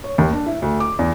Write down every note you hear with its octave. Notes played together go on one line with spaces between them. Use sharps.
C#5
D#2
D4
E4
D2
D6
E2